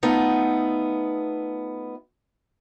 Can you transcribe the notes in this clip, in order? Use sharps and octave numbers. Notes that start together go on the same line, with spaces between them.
A3 B3 D#4 F4